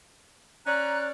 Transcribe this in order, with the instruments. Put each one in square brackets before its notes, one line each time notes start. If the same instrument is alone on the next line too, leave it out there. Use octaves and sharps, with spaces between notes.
[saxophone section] C#4 D5 [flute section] A#5 F#6